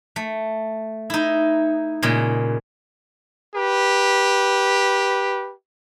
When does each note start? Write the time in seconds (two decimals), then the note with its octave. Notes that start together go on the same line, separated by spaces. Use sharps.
0.16 A3
1.10 D#4 E4
2.02 A#2 C#3 G#3
3.56 G4 B4